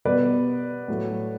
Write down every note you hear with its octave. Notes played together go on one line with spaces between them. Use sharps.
B2 G3 B3 B4 D5
A2 F#3 A3